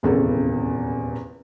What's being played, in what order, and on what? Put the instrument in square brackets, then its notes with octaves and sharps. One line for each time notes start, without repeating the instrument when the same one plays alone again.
[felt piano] D#1 G#1 E2 C#3 G#4 A4